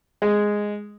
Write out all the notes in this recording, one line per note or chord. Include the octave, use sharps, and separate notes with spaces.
G#3